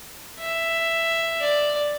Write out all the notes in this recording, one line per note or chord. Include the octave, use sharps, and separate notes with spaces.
E5
D5